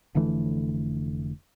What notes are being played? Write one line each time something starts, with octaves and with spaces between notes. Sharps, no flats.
F1 D3 E3 A3